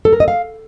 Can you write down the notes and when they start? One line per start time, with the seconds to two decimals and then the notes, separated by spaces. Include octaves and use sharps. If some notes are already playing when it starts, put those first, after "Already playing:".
0.05 A4
0.13 A#4
0.20 D#5
0.28 F5